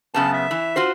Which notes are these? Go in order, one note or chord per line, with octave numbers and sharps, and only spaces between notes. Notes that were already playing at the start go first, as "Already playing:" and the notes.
F#2 C#3 B3 A5
E5
E3
F4 F#4 C5